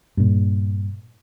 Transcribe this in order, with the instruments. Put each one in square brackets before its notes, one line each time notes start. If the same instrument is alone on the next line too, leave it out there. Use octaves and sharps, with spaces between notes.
[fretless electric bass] G2 A#2